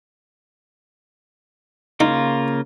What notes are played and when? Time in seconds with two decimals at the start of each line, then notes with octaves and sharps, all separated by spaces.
2.00 C#3 A#3 D#4 F4